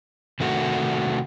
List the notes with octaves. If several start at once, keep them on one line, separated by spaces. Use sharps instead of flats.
C3 D#3 A3 F#4